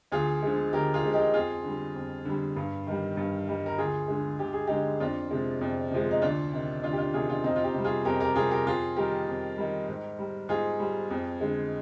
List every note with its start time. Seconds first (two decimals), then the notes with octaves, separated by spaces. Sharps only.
0.12 D2 F4 G#4
0.43 D3 F3 G#3
0.73 D2 G4 A#4
0.93 F4 G#4
1.03 D3 F3 G#3
1.13 D#4 G4
1.34 F2 F4 G#4
1.64 D3 G3
1.96 F2
2.25 D3 G3
2.56 G2
2.87 D#3 G3
3.17 G2
3.48 D#3 G3
3.66 A#4
3.78 D2 F4 G#4
4.08 D3 G#3
4.39 D2 G4
4.53 G#4
4.67 D3 G#3 D#4 G4
5.00 F2 D4 F4
5.31 C3 F3 G#3
5.61 F2
5.91 C3 F3 G#3
6.11 D#4
6.22 D2 D4 F4
6.53 C3 D#3
6.83 D2 D4 F4
6.93 G4
6.98 D4 F4
7.14 C3 D#3 F4 G#4
7.29 D4 F4
7.44 F2 C4 D#4
7.56 F4
7.64 D#4 G4
7.74 C3 G3
7.85 F4 G#4
8.05 F2 G4 A#4
8.20 G4 A#4
8.36 C3 G3 F4 G#4
8.51 G4 A#4
8.66 F2 F4 G#4
8.96 D#3 G3 G4 A#4
9.27 F2
9.58 D#3 G3
9.89 G#2
10.19 G3
10.49 G#2 F4 G#4
10.80 G3
11.11 F2
11.41 D3 G#3